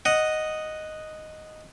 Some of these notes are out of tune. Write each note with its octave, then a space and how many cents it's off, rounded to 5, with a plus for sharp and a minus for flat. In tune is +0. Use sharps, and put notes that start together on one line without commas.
D#5 +0 F#5 +0